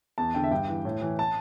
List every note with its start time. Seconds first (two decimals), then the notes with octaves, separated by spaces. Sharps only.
0.18 E2 A5
0.34 D3 G5
0.44 E5
0.51 G2 G5
0.68 E3
0.85 A2
1.02 E3
1.19 A5